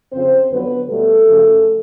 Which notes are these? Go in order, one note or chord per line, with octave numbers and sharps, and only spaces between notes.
F2 C#3 F3 C4 C5
F2 D3 F#3 B3 B4
B2 G3 A3 A4
F#2 C#3 F3